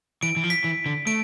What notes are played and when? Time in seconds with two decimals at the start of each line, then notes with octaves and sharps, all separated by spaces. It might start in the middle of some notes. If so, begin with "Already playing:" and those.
0.22 E3 D7
0.37 E3
0.44 F3
0.50 B6
0.64 E3
0.86 D3
1.07 A3 D7